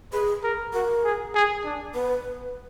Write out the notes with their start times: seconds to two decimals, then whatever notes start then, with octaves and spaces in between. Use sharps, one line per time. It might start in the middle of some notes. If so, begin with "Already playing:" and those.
0.12 G#4 B4
0.43 A#4
0.74 F#4 A#4
1.03 G#4
1.34 G#4
1.64 D4
1.94 B3 B4